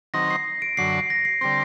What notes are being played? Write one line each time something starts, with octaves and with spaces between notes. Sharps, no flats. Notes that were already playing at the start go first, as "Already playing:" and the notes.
D#3 F#3 C4 D#4 A#6
C7
D7
F#2 D3 F#3 C7
A#6
C7
D3 G3 C4 A#6